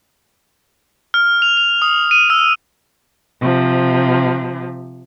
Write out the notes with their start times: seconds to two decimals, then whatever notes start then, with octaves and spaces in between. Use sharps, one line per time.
1.14 F6
1.42 F7
1.57 F7
1.82 D#6
2.11 D#7
2.30 E6
3.40 C3 F3